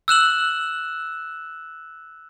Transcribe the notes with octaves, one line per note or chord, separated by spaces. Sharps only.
E6 F#6 E7 F#7